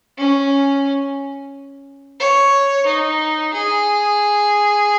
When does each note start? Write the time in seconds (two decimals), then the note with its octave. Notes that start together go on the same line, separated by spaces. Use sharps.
0.18 C#4
2.20 C#5
2.86 D#4
3.54 G#4